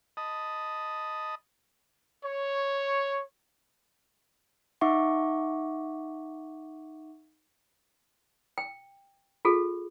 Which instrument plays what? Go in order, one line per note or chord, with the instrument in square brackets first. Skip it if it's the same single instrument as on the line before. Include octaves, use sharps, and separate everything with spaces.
[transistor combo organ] D#5 A5 B5 D#6
[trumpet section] C#5
[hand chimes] D#4 E5 F#5 C#6 D6
[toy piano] G5
F4 G#4 A4